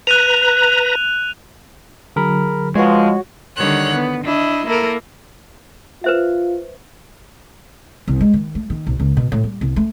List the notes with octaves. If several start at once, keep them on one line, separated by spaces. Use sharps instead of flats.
B4 A#5 F#6 D#7 F7
D3 F#3 G#4 A#4 B5
F3 G#3 F#4 G#4 B4 C#5
D3 D#3 G3 C#5 F#5 F#6
B3
D4 E4 D#5
A#3 E4 A4 A#4
F4 B4 C5 E5
C2
G#3
D#3
A3
D#3
B1
C#2
B2
A2
G3
C2
A3